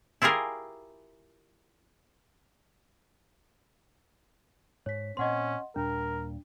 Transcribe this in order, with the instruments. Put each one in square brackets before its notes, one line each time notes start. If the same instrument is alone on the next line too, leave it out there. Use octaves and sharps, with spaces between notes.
[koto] E4 F4 G4 G#4 A#4
[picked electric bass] G#2 [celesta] C#5 B6
[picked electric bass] A#2 C4 [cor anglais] C#4 [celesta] D#5 F#5 C6
[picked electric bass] D#2 A#2 G3 [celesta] D4 [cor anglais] A#4